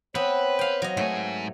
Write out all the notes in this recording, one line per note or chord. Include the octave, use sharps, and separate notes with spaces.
B3 C4 B4 C#5
F5 G5
F#3 D#5
G#2 A3 G#5